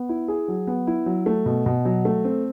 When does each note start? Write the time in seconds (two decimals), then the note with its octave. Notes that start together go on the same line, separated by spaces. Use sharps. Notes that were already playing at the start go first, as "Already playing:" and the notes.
Already playing: B3
0.09 E4
0.28 G#4
0.48 F#3
0.67 B3
0.87 E4
1.06 F#3
1.26 A3
1.46 B2
1.66 B2
1.85 F#3
2.05 A3
2.25 C4